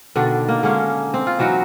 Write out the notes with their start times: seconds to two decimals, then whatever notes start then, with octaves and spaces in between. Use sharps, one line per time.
0.16 B2 D3 D#3 D4
0.48 A#3
0.63 D3 G#3 A#3 C#4
1.14 C4
1.27 F4
1.39 E3 F#3 D#4 F#4